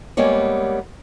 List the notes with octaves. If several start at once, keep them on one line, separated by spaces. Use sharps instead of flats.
G3 G#3 A#3 B3 C#5